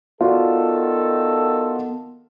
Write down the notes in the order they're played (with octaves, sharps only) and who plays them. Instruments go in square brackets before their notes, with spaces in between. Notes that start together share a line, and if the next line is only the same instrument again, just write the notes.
[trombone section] D#3 A4 [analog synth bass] B3 [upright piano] F4 F#4 D5